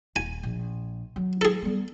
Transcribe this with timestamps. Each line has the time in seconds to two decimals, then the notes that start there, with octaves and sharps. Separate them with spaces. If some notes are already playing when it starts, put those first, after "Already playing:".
0.16 D#1 G#5
0.43 A#1
1.16 F#3
1.41 G#4 A4
1.62 G3 B3